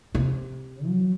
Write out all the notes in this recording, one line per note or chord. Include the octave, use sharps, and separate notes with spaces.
C3
F#3